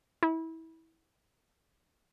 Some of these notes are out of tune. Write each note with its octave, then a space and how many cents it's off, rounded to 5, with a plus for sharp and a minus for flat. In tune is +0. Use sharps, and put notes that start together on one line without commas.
E4 -25